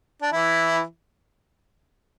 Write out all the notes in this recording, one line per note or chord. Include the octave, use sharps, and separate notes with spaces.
D4
E3 E4